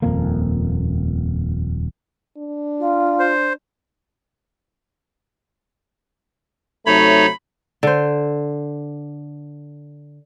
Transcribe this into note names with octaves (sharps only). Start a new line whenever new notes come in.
D#1 F2 A#3
D4
F4
C5
C3 F#3 A3 D#4 C#5 B5
D3 C5